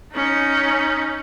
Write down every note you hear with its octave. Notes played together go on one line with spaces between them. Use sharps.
C#4 D#4